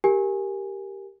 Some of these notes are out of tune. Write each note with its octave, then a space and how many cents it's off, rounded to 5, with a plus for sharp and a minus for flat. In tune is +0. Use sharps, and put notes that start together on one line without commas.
G4 +0 A#4 -5 G#5 -5